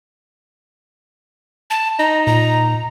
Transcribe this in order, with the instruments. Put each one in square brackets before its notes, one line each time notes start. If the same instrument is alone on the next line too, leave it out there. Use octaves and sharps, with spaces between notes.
[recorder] A5
[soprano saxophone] D#4 [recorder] A#5
[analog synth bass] A#2 [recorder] A#5